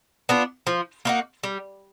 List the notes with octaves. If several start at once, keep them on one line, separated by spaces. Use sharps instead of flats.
B3 D4 F4
F3
A#3 D#4 F#4
G3